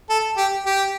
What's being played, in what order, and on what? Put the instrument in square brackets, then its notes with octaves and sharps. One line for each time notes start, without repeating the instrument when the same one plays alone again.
[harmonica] A4
G4
G4